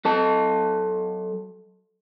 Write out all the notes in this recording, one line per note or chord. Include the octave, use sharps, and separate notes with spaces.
F#3 A4 A5